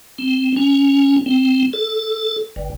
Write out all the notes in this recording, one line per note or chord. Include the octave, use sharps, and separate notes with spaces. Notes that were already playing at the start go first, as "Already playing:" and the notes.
C4
C#4
C4
A4
G1